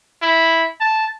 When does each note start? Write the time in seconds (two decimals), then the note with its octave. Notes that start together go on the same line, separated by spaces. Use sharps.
0.22 E4
0.80 A5